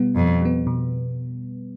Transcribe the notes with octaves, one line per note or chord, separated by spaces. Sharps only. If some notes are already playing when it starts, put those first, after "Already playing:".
Already playing: B2 G3 B3
F2 B2
G3 B3
B2